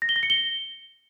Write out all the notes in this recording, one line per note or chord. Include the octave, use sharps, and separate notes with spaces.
A#6
G7
A#6
C#7
G7